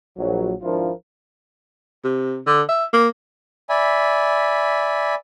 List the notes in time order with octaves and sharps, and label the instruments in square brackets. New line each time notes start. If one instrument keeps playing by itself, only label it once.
[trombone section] A#1 F#3
G#1 F3 D4 E4 F4 A#4
[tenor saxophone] C3
D3
E5
A#3
[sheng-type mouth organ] D5 E5 G#5 B5